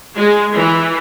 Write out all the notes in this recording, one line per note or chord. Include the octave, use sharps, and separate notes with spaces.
G#3
E3